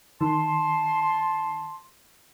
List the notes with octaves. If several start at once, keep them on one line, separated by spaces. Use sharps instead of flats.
D#3 A5 C6